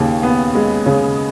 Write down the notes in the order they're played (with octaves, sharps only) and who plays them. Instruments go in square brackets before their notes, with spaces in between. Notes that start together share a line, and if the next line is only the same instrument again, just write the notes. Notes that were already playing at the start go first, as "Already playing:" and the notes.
Already playing: [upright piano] D#2 C#3
B3
G#3
C#3